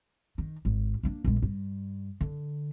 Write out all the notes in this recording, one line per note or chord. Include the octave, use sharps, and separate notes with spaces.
D#3
G#1
A#3 D4
A#1 G#3
G2
D3